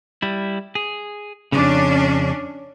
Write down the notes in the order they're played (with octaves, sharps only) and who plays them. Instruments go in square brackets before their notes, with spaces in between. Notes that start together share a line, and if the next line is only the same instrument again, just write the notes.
[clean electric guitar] G3 E4
G#4
[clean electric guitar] F2 C#3 [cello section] C#4 D4